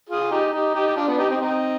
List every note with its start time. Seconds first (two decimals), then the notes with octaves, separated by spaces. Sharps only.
0.09 F4 G#4
0.31 D#4 G4
0.53 D#4 G4
0.74 D#4 G4
0.88 G4
0.96 D4 F4
1.07 B3 D4
1.18 D#4 G4
1.30 C4 D#4
1.41 C4 D#4